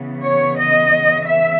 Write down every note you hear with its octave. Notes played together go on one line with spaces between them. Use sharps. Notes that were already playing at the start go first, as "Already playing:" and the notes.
Already playing: C#3 E3 B3
C#5
D#5
E5